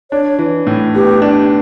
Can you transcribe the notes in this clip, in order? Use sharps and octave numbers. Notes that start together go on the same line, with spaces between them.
D4 C#5
E3
A2
B3 G4
D4